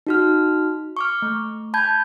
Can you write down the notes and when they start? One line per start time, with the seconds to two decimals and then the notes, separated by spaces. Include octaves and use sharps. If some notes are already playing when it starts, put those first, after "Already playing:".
0.07 D#4 F#4 F6
0.97 C#6 D6 F6
1.22 A3
1.74 A5 B5 G6 G#6